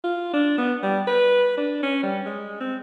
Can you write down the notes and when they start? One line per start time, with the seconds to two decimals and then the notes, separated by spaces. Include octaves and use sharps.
0.04 F4
0.33 D4
0.58 B3
0.83 G3
1.07 B4
1.57 D4
1.83 C#4
2.03 G3
2.26 G#3
2.60 C4